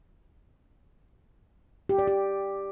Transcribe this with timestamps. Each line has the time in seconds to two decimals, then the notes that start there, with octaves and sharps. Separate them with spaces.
1.89 G4
1.98 D5
2.08 G4